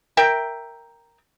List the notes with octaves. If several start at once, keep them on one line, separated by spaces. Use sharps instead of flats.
A#4 E5 G5